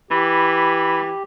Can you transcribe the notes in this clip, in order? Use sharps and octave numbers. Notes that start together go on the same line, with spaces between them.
E3 G4 B5